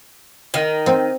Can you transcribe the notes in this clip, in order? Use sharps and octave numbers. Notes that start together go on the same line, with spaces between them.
D#3
C4